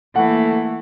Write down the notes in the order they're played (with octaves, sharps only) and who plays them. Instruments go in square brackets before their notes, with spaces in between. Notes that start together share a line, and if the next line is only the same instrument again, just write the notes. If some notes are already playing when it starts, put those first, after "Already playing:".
[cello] E3 A#3 [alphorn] A3 [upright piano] F#5